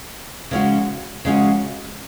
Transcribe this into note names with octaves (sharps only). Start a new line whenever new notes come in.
C#3 G#3 C#4 F#4
C#3 G#3 C#4 F#4